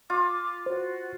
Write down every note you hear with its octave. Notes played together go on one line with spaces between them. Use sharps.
F4 D6
F#4 C5